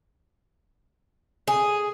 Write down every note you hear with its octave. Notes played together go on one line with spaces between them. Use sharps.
G#4